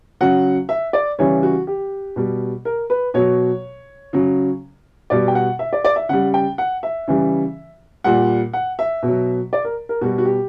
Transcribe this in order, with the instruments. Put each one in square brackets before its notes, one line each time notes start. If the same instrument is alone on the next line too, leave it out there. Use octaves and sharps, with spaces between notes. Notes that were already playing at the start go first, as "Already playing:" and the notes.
[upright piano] C#3 F#3 F#5
E5
D5
C#3 E3 G3 C#5
F#4
G4
B2 G3
A#4
B4
B2 F#3 C#5
C#3 F#3
B2 G3 D5
G5
F#5
E5
D5
D5
E5
C#3 G3 F#5
G5
F#5
E5
C#3 E3 G3
A#2 G3 F#5
F#5
E5
B2
F#3
D5
A#4
A#4
B2 G3 F#4
F#4
G4